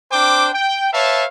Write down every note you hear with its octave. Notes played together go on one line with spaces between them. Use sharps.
C4 D4 C5 G5 D6
G5
B4 C#5 E5 F5 A5